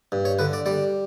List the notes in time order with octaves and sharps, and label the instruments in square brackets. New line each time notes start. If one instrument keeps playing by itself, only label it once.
[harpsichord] G2
C#5
D3 B4
D5
G3 D5